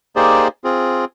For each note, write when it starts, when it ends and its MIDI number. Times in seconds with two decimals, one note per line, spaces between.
0.16 0.48 58
0.16 0.48 63
0.16 0.48 67
0.16 0.48 68
0.16 0.48 72
0.16 0.48 74
0.64 1.05 60
0.64 1.05 65
0.64 1.05 68